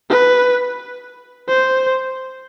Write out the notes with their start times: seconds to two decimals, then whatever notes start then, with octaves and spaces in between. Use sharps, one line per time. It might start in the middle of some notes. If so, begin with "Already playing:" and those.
0.10 B4
1.49 C5